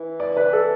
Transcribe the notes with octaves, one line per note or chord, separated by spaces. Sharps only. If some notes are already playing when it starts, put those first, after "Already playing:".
Already playing: E3
D5
B4
A4